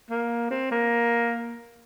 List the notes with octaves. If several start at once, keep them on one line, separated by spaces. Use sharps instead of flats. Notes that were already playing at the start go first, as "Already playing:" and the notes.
A#3
C4
A#3